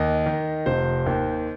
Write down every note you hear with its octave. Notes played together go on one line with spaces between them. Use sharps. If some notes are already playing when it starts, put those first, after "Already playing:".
Already playing: D#2 D#5
D#3
F1 C5
D#2 D#3